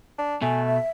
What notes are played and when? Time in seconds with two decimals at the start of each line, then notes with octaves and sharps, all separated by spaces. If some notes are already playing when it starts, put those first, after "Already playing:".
0.18 D4
0.42 B2 A3 G#5
0.66 E5